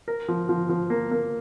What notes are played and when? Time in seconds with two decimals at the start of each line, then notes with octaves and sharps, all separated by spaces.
0.08 A#4
0.28 F3
0.49 F3
0.69 F3
0.90 A#3
1.11 A#3